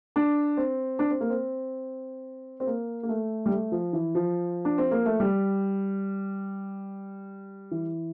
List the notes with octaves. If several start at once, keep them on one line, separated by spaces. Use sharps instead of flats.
D4
C4
D4
C4
A#3
C4
C4
A#3
A#3
A3
G3
A3
F3
E3
F3
D4
C4
A#3
A3
G3
E3